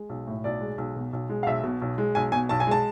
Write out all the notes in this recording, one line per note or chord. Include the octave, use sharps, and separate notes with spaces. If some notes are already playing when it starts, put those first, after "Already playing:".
Already playing: G#3
B1
A2
B1 D5
G#3
B1
B2
B1
G#3
F5
B1 E5
B2
B1
G#3
B1 G#5
B2 G#5
B1 A5
G#5
G#3 A5